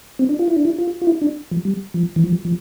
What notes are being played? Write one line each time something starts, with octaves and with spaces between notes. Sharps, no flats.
C4
D4
F4
E4
D4
E4
F4
F4
E4
D4
F3
G3
F3
E3
F3
F3